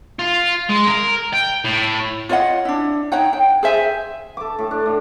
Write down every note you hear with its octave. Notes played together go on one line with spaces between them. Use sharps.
F4
G#3
A#4
G5
A2
F4 C#5 D#5 F#5
D4 E4
D#4 C#5 F#5 G5
G5
G#4 C5 E5 G#5
A4 D6
A2
D4
A2